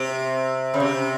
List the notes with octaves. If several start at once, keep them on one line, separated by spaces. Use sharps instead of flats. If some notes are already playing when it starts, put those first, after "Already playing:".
Already playing: C3
C#3
C3